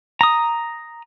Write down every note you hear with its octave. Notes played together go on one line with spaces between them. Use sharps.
A#5 D#6